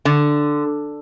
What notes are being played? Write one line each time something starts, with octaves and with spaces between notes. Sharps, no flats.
D3